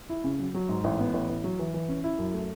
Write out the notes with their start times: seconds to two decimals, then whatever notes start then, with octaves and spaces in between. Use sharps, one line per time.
0.09 E4
0.24 C#3
0.39 F#3
0.54 F#3
0.69 G#2
0.84 A1
0.99 B3
1.14 A1
1.29 A1
1.44 F#3
1.59 E3
1.74 E3
1.89 C#4
2.04 E4
2.19 F#2
2.34 A3